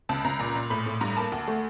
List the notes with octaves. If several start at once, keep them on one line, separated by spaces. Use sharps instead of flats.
C#2 A5
C#2 A#5
A#2 A#5
A#2
A2 B5
A2
G2 A#5
A#3 A5
D2
A3